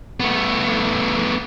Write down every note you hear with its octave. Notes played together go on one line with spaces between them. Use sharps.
A3 B3